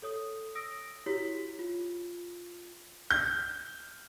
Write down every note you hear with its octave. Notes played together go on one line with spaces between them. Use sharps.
A4 C#5 D#6
D#6 E6 A#6 D7
E4 F#4 G4 C#5 B6
F4
G6